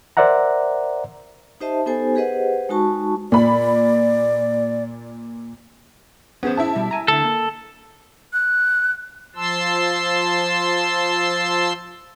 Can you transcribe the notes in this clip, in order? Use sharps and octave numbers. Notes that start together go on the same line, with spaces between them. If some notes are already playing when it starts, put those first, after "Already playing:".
A#4 C5 D5 E5 F#5 A#5
D#4 G4 C5 D#5 E5 A5
B3 D#4 G4 A4 C5 G#5
G4 G#4 B4 C5 D#5 F#5
G#3 D#4 F#4 A5 C#6
A#2 D5 B5
B3 C#4 G#4 C5
E4 E5 A5
B2 G3
G#5 A#5
D2 D3 A4
A#3
F#6
F3 A5 C6 E6